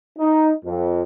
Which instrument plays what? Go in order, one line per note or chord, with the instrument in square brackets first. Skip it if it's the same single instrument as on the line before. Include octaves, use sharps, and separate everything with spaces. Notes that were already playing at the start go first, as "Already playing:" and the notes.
[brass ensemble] D#4
F2